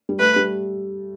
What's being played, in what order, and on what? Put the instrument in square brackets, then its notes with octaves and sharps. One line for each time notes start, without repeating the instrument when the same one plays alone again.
[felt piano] G3
[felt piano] A3 [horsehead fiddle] B4
[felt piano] G3